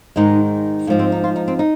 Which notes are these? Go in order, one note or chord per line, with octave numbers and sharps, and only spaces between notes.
G#2 D#3 G#3 D#4
G#2 F3 G#3 A#3
C4
D#4
F4
D#4
C4
D#4